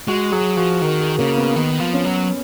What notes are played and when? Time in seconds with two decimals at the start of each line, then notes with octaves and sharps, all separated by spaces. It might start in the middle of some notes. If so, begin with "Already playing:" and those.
0.08 G#3 F#4
0.32 F#3 G#4
0.56 F3 F#4
0.82 D#3 A#4
1.00 G#4
1.19 C#3 A#3
1.38 B3
1.56 D#3 B3
1.80 F3
1.93 C#4
2.05 F#3